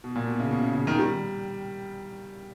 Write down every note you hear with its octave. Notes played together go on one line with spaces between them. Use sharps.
B2
A#2
B2
C#3
B2
C#3
C#3
D#3
G3